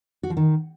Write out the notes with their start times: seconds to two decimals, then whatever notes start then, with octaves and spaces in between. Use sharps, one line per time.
0.23 F#4
0.30 F3
0.37 D#3